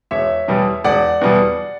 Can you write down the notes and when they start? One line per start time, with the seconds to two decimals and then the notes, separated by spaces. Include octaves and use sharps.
0.11 E1 C#5 E5
0.48 E2 B2 G3
0.84 E1 D5 F#5
1.21 E2 B2 G3